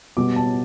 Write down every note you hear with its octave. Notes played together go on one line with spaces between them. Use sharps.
B2 G3 B3 D6
A5